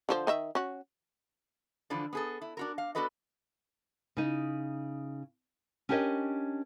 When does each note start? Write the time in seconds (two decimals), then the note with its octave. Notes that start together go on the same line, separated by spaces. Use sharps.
0.09 D3 F3 C5
0.27 D#3 D#5 E5
0.55 C#4 F#4
1.90 D3 E3 F3 D4
2.13 B3 G#4 A4
2.42 E4
2.57 D4 F#4 A#4
2.78 F5
2.95 B3 D4 F#4 A4 B4 D#5
4.17 C#3 D#4
5.89 C#4 D4 G4 A#4 C#5 D#5